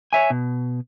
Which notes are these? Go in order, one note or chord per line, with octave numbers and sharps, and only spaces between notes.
C#5 E5 G#5
B2